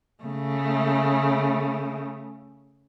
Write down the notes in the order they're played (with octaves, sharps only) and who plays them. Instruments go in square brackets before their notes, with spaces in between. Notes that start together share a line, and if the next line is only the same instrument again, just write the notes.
[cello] C#3 A3